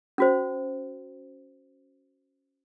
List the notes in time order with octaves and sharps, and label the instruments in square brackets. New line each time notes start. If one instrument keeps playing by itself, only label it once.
[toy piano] C#4 F#4 C5